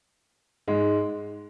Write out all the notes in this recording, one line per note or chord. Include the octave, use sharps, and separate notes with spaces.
G#2 G#3